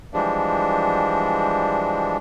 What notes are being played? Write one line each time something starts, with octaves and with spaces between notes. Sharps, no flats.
E3 F3 G3 G#3 D4